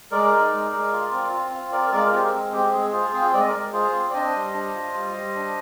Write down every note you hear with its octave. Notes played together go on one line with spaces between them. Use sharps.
G#3 A#4 D5
D#4
G#3
G#3
F4
C4
F4
C4
F4 A#4 D5
G#3 A#4 D5
C4 G4 A#4
G#3
C4 G4
G#3 G#4
F4 G#4 C5
C4 G#4 C5
G#3 D5
D#5
A#4 D5
G#3
F4 G#4 C5
C4
D5
D4 C5 D#5
G3
D4
F4
G3
G3
D4